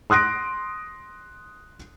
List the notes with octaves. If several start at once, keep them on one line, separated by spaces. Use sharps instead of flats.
C6 D#6 F#6 A#6 D7